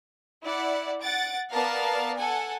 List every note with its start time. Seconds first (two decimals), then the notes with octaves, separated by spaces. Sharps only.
0.43 E4 D5 F#5
1.01 F#5 A6 D7
1.52 B3 A#4 D5 F5 A5
2.18 A4 F#5 G#5